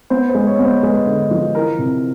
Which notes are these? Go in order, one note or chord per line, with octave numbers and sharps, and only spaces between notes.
B3 C5
C5
G#3
C#5
B3
C5
G#3 B4
D3
F3
E3 A#4
C3